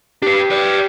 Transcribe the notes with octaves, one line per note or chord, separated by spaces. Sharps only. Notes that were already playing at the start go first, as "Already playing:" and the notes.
D4 G4 B4
B4 D5
G4